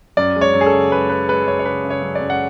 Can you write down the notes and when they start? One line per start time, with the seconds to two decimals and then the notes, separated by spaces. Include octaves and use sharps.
0.17 F#2 D5
0.36 G#3
0.41 C#5
0.54 F#2
0.61 G#4
0.66 A4
0.73 C#3
0.91 G#3 B4
1.09 G#3 B4
1.29 G#3 B4
1.46 F#2 C#5
1.59 C#5
1.65 C#3 B4
1.84 C#3
1.90 C#5
2.02 F#2
2.15 D5
2.21 F#2
2.30 F#5